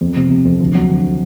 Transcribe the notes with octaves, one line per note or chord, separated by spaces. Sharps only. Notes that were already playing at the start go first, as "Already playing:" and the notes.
F2
C3
C3
F2
D2
F#3
D2